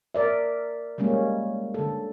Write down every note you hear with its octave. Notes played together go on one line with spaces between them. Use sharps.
A#4 D5 E5
G3 G#3 A#3 C#4
D3 A4